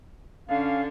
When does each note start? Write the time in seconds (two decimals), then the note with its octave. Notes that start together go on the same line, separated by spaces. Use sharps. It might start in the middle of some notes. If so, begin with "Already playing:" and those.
0.49 D3 C#4 F5